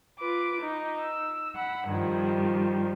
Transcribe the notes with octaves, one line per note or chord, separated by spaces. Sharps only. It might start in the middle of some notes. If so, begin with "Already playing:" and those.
F4 B4 D6
D#4
E6
F#5 B5
G2 D#3 F3 G3